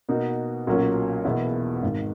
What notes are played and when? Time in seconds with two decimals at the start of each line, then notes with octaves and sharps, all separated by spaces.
0.09 B2 A#3 D#4 F#4
0.67 B1 A#2 F#3 A#3 C#4
1.24 E1 E2 B2 A#3 E4
1.82 G#1 G#2 D#3